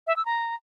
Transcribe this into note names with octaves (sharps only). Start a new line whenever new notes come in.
E5
E6
A#5